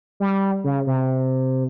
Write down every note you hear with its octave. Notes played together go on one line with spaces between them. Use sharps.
G3
C#3
C3